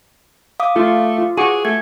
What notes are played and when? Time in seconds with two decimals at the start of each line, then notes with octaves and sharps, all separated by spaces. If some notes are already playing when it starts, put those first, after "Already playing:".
0.60 F5 D6 D#6
0.76 A3 F4
1.18 F4
1.37 F#4 G#4 G#5 C#6 D6
1.65 A3 G#6